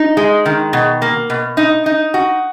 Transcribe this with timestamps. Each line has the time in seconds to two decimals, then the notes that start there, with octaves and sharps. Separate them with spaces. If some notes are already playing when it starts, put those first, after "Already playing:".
Already playing: D#4
0.17 G#3
0.46 D#3
0.73 B2
1.02 A#3
1.30 B2
1.57 D#4
1.86 D#4
2.14 F#4